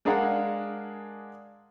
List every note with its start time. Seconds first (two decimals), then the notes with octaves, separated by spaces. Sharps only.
0.05 G#3 D4 G#4 A#4 F5 F#5